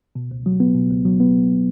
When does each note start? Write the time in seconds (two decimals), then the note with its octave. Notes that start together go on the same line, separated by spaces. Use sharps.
0.15 B2
0.31 C#2
0.46 F#3
0.60 B3
0.75 B2
0.90 C#2
1.05 F#3
1.20 B3